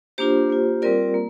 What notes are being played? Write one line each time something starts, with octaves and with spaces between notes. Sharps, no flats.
A#3 D4 F4 G4 C5
A#3 F4
G3 C4 F4 A#4 D5
A#3